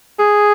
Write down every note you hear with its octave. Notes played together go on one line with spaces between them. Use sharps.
G#4